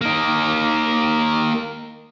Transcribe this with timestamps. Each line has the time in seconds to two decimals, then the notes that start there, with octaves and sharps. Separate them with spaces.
0.01 A#3 D#4